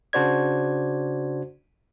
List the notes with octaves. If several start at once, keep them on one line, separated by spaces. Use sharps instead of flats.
C#3 D4 F#4 C5 D5 G#6